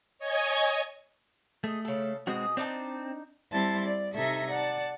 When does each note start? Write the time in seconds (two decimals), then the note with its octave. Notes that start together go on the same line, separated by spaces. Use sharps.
0.18 C#5 D#5 G#5 G#6
1.64 A3 G#4 D#5
1.85 C#3 A4
2.27 B2 G#3 C4 F#4 G#4 D#5
2.57 C4 D4 D#4 A5
3.53 G3 C4 E4 A5 C6 A6
3.86 D5
4.16 C3 D#4 A4 E5 G#6 A#6
4.51 D5 F#5 A5